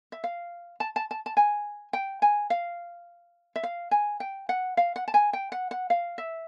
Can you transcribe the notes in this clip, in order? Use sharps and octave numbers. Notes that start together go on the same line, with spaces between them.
E5
F5
A5
A5
A5
A5
G#5
G5
G#5
F5
E5
F5
G#5
G5
F#5
F5
F#5
A5
G#5
G5
F#5
F#5
F5
E5